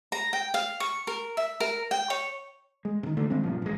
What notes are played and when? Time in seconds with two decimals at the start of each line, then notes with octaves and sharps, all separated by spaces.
0.12 A#5
0.33 G5
0.54 F5
0.80 C#6
1.07 A#4
1.37 E5
1.60 A#4
1.91 G5
2.10 C#5
2.85 G#3
3.03 C3 D#3
3.17 D3 A3
3.30 D#3 G#3 C4
3.43 G2 A#2 F3
3.62 A1 G#3